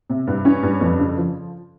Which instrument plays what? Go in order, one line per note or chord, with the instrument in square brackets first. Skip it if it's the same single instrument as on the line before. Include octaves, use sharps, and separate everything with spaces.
[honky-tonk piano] C3
G2
C#4
G2
F2
C#3
F3